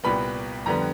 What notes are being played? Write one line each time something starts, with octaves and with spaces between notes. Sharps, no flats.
C2 A#2 G3 B3 B5
F2 D3 G3 B3 A#5